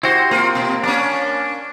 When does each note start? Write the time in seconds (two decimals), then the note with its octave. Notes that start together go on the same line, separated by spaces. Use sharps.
0.03 E4 F#4 G4 C5
0.31 A#3 C4 F4
0.55 B2
0.83 A#3 C#4 D4